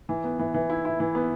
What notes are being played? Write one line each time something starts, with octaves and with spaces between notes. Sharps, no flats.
E3
B3
E3
E3
E4
E4
E3
B3